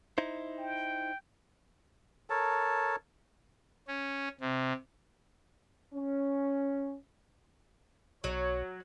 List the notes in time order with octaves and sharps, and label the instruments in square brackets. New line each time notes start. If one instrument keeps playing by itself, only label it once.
[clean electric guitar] D#4 E4 C5
[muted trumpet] G5
[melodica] A4 A#4 C#5 A5
[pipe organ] C#4
C3
[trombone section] C#4
[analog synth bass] B1 [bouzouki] F#3 [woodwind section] C#5